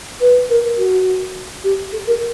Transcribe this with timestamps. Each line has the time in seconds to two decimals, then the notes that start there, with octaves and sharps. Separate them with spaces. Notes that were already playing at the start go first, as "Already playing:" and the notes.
0.20 B4
0.49 A#4
0.77 F#4
1.63 G4
1.92 A4
2.06 A#4